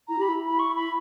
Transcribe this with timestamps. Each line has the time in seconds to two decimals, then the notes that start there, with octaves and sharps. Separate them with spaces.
0.08 E4 A#5
0.18 G4 B5
0.29 E4
0.47 B5
0.59 C#6
0.76 B5